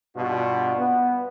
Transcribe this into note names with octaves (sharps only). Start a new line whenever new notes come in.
G2 B2 D4 F4 F#4
B3